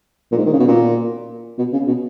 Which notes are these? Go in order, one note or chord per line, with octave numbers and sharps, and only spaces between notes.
A#2
G#2
D#3
C#3
B2
A#2
B2
C#3
B2